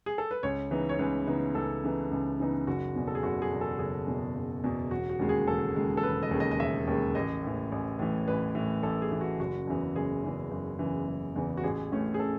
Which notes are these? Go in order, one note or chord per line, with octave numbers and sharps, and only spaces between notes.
G#4
A4
B4
C#2 C#5
C#3 E3 B3 D#4
C#5
C#2 B4
C#3 E3 B3 D#4
C#2 A4
C#3 E3 B3 D#4
C#2
C#3 E3 B3 D#4
F#1 F#4
E2 B2
A4
G#4
F#1 F#4
G#4
E2 B2
A4
F#1 G#4
E2 B2
F#1
E2 B2
E1 F#4
F#4
D#2 C#3 G#3
G#4
E1 A4
D#2 C#3 G#3
A4
E1 B4
D#5
D#2 C#3 G#3
D#5
D#5
E1 E5
D#2 C#3 G#3
A1 D#5
A2 E3
A1
A2 E3
A1 B4
A2 E3
A1 A4
G#4
A2 E3
F#4
F#1 F#4
E2 C#3 E3
F#1 G#4
E2 C#3 E3
F#1
E2 C#3 E3
F#1
E2 C#3 E3
F#4
A1 G#4
A2 E3 A3 C#4
G#4
A4